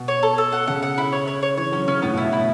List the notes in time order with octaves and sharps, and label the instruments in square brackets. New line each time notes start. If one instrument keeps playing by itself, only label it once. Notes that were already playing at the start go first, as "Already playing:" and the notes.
Already playing: [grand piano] B2
[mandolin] C#5
A4
A4
F#5
[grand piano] C#3 [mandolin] F#5
[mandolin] F#5
E4
C#5
C#5
C#5
[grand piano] E3 [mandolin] C#5
[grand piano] F#3 [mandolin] C#4
[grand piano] C#3 [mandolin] C#4
[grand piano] A2 [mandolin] B3
[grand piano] B2
[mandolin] E4
[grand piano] B2
[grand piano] A2 [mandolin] E4